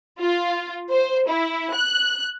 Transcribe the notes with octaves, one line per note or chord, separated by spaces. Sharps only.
F4
C5
E4
F#6